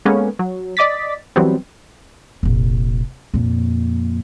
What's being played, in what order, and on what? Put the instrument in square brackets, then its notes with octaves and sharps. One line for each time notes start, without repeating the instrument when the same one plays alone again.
[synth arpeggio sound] G#3 A#3 B3 C#4 A4
F#3
D5 D#5 D6 A6 B6
E3 F#3 G3 B3 C4
[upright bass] F1 A#1
F2 A#2